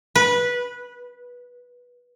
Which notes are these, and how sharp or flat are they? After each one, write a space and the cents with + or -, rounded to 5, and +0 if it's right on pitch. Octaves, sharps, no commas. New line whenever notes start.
B4 -15